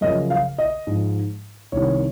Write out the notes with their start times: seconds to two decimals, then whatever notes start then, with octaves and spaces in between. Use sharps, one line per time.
0.01 F#2 C#3 F3 D#5
0.30 F5
0.58 D#5
0.87 G#2 F3
1.72 C2 C3 D#3 C#5